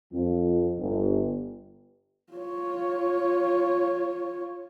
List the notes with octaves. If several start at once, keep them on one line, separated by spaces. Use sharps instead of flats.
F2
G1
F4 C#5